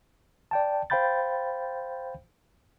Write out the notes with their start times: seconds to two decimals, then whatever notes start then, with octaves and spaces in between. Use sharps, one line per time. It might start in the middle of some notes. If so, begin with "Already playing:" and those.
0.51 D5 G5 A5
0.90 C5 F5 G5 B5 G6 A6